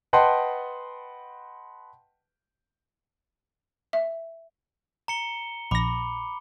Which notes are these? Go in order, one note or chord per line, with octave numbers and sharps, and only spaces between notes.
B4 D#5 F#5 G5 A5 C6
E5
A#5 C#7 G7
A#1 B5 D6 A#6